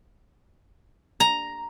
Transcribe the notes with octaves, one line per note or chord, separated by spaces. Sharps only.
A#5